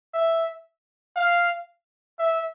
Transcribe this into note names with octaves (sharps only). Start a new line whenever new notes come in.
E5
F5
E5